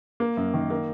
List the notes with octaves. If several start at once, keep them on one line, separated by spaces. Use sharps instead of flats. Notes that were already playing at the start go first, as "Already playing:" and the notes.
A#3
F#2
D#3
A#3